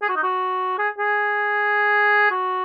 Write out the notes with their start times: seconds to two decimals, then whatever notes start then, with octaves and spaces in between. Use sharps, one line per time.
0.02 G#4
0.09 F#4
0.16 D#4
0.23 F#4
0.78 G#4
0.99 G#4
2.31 F#4